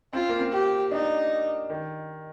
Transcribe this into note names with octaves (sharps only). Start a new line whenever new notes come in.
C4 F4
A#3
C4
G4
D4 D#4
D#3